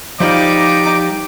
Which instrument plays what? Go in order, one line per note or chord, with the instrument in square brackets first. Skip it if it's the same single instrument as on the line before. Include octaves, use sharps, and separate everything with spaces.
[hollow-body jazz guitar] F3 G3 F5 [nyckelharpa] D#4 [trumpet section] D6